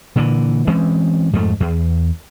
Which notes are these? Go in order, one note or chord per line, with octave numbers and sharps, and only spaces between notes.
A#2 D3 E3
E3 G#3 C4 C#4
F2 G#2 G#3 A3
E2